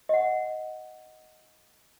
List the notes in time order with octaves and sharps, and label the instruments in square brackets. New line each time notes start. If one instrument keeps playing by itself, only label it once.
[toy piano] D#5 F#5